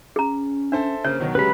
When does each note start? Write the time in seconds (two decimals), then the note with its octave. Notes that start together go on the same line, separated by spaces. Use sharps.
0.16 C#4 G#4 A#5
0.72 D4 A4 C5 E5
1.04 C#3 A#3 C5 C#5
1.20 B2 D#3 F#3
1.35 C#3 F#3 G#3 G4 B4 B5